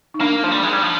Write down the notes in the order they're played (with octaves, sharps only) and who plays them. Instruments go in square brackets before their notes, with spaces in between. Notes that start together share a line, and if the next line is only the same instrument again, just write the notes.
[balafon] D#4
[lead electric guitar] A#3 [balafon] D4
[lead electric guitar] F3
G3
G#3
G3
F3